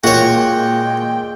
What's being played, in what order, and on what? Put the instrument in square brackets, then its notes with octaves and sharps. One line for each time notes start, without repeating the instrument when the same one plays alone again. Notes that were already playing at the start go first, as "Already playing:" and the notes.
[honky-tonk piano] A#2 [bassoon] G#3 [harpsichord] F#4 C#5 [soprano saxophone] G5